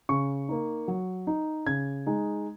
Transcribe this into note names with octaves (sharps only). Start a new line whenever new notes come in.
C#3 C#6
A#3 D#4
F#3
D#4
C#3 G#6
G#3 D#4